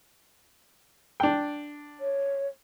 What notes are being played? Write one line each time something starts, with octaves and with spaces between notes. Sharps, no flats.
D4 G5
C#5